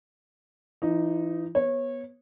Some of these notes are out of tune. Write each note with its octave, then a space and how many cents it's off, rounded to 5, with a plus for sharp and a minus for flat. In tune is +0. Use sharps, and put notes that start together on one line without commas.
E3 +35 D#4 +0
B3 -15 C#5 -25